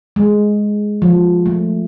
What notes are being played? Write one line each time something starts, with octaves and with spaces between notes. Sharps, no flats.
G#3
F3
A3